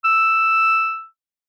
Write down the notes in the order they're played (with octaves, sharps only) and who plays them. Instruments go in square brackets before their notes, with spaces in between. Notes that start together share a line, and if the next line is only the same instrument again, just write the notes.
[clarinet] E6